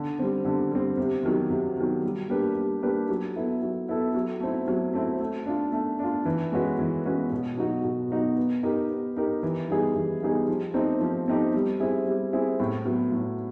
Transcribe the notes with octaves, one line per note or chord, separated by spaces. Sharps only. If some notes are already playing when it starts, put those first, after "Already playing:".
Already playing: D3
G3 C4
D3
G3 C4
C3
D#3 F#3
C3
D#3 F#3
G3
A#3 D4 G4 B4
G3
A#3 D4 G4 B4
F#3
B3 E4 A4
F#3
B3 E4 A4
F#3
A3 C4 E4
F#3
A3 C4 E4
A3
D4 F4
A3
D4 F4
E3
G#3 C#4 F#4 B4
E3
G#3 C#4 F#4 B4
B2
F#3 B3 D#4 F#4
B2
F#3 B3 D#4 F#4
B3
D#4 G4 A#4
B3
D#4 G4 A#4
E3
G3 B3 D#4 G#4
E3
G3 B3 D#4 G#4
F3
A3 C4 D#4 G4
F3
A3 C4 D#4 G4
G3
C4 E4 G#4
G3
C4 E4 G#4
A2
F#3 B3
A2